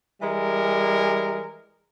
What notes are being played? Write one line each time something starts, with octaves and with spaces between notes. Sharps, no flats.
E3 G3 G#3 A#4